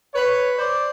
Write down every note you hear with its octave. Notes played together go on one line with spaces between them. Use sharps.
B4 C#5
C5 D5